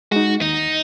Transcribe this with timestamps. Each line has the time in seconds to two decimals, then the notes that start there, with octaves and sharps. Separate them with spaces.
0.12 G#3 D#4 F#4
0.41 D#2 D#4